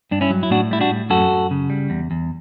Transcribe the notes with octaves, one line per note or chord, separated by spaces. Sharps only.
G2 D4
C#4 E4
F#3
E4
A2 D4 F#4
G3 E4
D4 F#4
A2
F#2 F#4 A4
F#2
C#3
G3
E2
E2